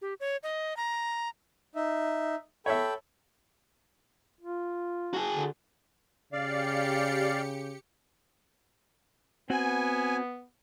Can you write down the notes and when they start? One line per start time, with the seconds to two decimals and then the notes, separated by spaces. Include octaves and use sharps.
0.02 G4
0.20 C#5
0.43 D#5
0.77 A#5
1.75 D#4 E5
2.66 A4 C#5 E5 G5 B5
4.41 F4
5.14 F#4 G#4
5.35 D3
6.33 C#3 G4 D5 F5 C#7
9.50 B3 C4 F#4 G#5